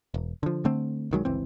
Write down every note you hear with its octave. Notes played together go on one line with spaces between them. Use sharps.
E1
D3 F3
D3 A3 C4
B1 D#3 F#3 G#3
G1 C#2 E3 C4